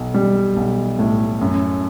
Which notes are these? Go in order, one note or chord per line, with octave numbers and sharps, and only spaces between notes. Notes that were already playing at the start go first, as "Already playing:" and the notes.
Already playing: B1
G3
B1
A2
F#2